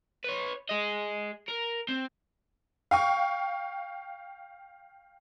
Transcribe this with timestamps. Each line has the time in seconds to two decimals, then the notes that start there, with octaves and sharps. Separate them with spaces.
0.24 B4 C#5
0.69 G#4 D#5
1.48 A#4
1.89 C4
2.91 F5 G5 C#6